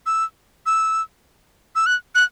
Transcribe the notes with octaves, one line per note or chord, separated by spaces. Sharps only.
E6
E6
E6
F#6
F#6